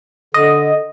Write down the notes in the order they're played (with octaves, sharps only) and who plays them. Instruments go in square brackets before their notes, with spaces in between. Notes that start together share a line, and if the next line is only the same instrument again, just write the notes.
[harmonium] D3 [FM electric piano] D#5